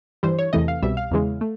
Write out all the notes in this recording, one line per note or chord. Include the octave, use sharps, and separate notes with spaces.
G2 E3 G3 C5
C#5
E2 C3 E3 A3 D#5
F5
C2 B2 G3 E5
F5
E2 C#3 E3 G#3
A3